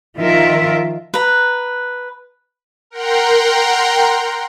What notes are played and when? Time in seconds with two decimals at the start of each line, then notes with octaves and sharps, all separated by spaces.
0.17 D#3 F3 F4 A#4 E5
1.14 B4 A#5
2.90 A#4 F#5 G5 A#5 C6